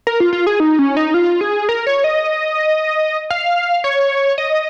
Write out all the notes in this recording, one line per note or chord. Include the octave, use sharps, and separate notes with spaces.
A#4
F4
F4
G#4
D#4
C#4
D#4
F4
G#4
A#4
C#5
D#5
F5
C#5
D#5